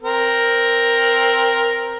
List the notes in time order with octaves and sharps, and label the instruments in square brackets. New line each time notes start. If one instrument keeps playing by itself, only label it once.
[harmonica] C4 A#4